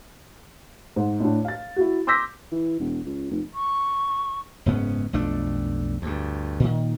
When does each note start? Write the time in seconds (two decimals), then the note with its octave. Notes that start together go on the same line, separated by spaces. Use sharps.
0.96 G#2
1.20 A2 D4
1.45 F5 A6
1.76 E4 F#4
2.07 C6 D6 E6 G6 A#6 B6
2.52 E3
2.79 E1
3.05 C#2
3.31 F1
3.54 C#6
4.66 F#1 G#2 B3 C#4
5.13 B1 F2 A3 D4
6.02 D2 G2
6.60 A#2 D#3